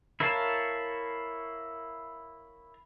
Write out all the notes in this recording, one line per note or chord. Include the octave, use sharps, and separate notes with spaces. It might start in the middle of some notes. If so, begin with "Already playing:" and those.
E4 A#4 C#5 F5 A5